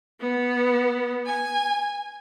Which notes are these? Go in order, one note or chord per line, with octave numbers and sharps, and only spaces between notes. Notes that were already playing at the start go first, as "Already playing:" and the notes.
B3
G#5